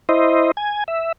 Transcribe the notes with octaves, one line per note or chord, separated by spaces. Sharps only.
E4 C5 D#5
G#5
E5